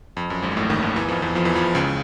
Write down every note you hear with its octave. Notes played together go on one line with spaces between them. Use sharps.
F2
F#2
G#1 G#2
A1 A2
D#2 D#3
D#2 D#3
E2 E3
F2 F3
E2 E3
F2 F3
E2 E3
F2 F3
C#2 C#3